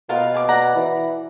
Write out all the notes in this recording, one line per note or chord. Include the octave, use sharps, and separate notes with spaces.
B2 F4 A#4 F5
G#4 D6
D5 F#5 A#5
E3